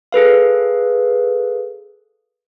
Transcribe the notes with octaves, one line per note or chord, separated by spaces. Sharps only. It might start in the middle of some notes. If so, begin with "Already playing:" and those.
G#4 A4 B4 F5